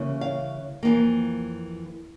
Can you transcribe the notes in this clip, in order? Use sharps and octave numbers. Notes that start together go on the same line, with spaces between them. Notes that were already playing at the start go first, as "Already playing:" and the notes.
Already playing: C#3 E3 G3 A#3 C#4
F5
F2 E3 A#3